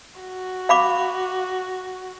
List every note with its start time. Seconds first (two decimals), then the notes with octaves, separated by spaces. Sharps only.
0.20 F#4
0.69 F5 B5 D6